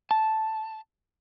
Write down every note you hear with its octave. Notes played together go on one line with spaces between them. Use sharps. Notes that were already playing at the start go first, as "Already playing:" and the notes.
A5